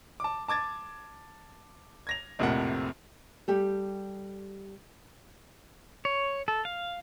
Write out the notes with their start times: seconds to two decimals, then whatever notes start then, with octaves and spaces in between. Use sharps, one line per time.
0.20 A5 D6
0.48 A5 D6 G#6 A6
2.07 G#6 A#6 F7
2.39 A#1 F2 A2 C3 A#4 F#5
3.48 G3 G4 A4
6.05 C#5
6.48 A4
6.65 F5